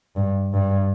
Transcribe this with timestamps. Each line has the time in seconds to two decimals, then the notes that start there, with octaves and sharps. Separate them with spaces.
0.16 G2
0.53 G2